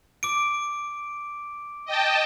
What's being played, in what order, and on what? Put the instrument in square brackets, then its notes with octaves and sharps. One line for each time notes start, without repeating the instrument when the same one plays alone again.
[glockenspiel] D6 D7
[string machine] D#5 G5 A5